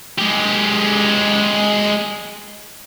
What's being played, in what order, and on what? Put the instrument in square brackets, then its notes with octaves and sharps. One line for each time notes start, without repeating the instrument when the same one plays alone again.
[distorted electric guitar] G#3 G4